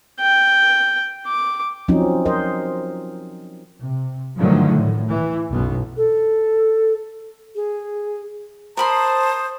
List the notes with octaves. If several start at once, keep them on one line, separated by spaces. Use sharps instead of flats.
G5
D6
F3 F#3 C4 C#4 D#4
A#4 C5 D#5
C3
G2 D3 D#3 F3 F#3 A3
A2
E3
B1 F#2 B3
A4
G#4
A#4 C5 A5 B5 C6 D#6